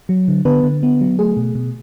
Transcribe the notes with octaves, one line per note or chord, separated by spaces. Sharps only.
F#3
D3
D3 B3 B4
D3
B3
F#3
A3 G#4
B2
B2